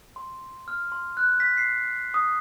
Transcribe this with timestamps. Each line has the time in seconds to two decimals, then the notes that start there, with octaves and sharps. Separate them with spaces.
0.16 C6
0.68 F6
0.92 C6
1.17 F#6
1.40 B6
1.57 C7
2.14 D#6